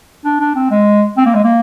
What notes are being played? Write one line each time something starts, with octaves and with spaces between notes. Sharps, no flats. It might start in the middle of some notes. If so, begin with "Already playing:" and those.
D4
D4
C4
G#3
C4
A#3
G#3
A#3